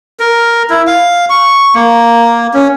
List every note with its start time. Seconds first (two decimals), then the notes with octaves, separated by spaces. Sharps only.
0.20 A#4
0.70 E4
0.87 F5
1.30 C#6
1.75 A#3
2.54 C#4